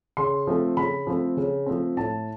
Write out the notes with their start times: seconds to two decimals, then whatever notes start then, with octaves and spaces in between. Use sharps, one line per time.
0.17 C#3 C6
0.47 F3 A3 C4
0.77 C#3 B5
1.07 F3 A3 C4
1.37 C#3
1.66 F3 A3 C4
1.97 A2 A5